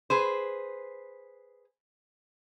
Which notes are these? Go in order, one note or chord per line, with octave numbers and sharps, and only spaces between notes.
G#4 B4 C5